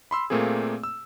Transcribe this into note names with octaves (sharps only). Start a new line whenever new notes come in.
B5 C6 E6
A#2 A3 A#3 C4 G#4
E6